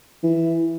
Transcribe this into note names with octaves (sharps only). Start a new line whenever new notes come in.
E3